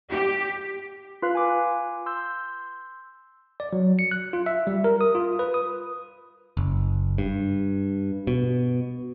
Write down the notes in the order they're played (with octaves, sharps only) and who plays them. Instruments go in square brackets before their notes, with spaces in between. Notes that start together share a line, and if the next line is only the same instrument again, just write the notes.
[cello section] G4
[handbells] F4 B4 F5 F#6
G#5 D6
C6 E6 G6
[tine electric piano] D5
F#3
C#7
F#6
F4
E5
G3
A#4
D#6
F4
B4
D#6
[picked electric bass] F#1
G2
B2